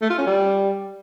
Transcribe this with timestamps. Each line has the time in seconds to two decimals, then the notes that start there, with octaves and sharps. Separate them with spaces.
0.02 A3
0.10 F4
0.18 C#4
0.27 G3